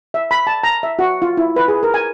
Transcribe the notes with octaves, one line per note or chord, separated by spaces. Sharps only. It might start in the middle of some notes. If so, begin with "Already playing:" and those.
E5
B5
A5
A#5
E5
F#4
F4
E4
B4
G#4
A#4
G#5